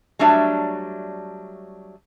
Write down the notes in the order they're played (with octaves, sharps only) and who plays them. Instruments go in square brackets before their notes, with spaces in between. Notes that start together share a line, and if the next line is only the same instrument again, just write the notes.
[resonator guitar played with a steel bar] F#3 G3 A3 D4 C#5 E5